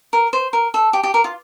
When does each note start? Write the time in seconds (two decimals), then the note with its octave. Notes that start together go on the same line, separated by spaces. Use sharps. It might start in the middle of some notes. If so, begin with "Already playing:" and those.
0.13 A#4
0.33 C5
0.53 A#4
0.74 A4
0.93 G4
1.03 G4
1.14 A#4
1.24 F4